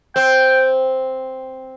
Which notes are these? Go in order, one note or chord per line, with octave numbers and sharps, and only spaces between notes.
C4 G5